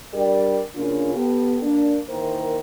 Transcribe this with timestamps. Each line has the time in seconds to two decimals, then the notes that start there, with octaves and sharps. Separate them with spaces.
0.14 G3 D4 G4 A#4 D5
0.75 C#3 A#3 C#4 D4 F4
1.14 B3 G4 A4
1.62 A#3 D4
2.09 D#3 E3 A#3 E4 A#4 C5